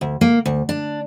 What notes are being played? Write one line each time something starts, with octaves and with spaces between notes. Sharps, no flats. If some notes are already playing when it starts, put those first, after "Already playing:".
D2
A#3
D2
D4